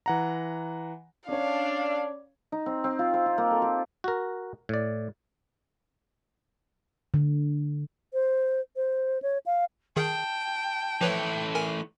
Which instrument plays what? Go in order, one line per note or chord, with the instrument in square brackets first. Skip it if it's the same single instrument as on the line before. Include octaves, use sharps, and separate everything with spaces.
[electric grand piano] E3 F#5 A#5
[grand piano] C#4 C#5 [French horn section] D4 [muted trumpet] D5 [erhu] F5
[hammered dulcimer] D#4
C4
C4
F4
C5
F4
A#3
A4
G4
[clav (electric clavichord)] F#4 A#4
A2 D5
[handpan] D3
[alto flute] C5
C5
C#5
F5
[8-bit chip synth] D#3 G#4 [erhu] G5 [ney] A5
[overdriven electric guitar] E3 A3 [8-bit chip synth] F3 B4 C#5
[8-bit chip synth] A#4 G#5